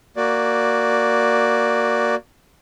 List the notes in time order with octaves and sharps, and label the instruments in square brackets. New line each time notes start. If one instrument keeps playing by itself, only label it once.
[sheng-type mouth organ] A#3 F#4 D5